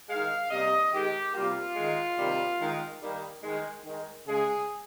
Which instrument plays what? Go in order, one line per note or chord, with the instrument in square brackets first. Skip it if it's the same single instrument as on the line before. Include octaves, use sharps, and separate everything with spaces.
[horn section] D#3 G#3 F5
C3 G3 A#3 D#5
D#3 G#3 G4
C3 G3 A#3 F4
D#3 G#3
C3 D#3 G3 A#3
D#3 G#3
D#3 G3 A#3
D#3 G#3
D#3 G#3
C#3 G#3 G#4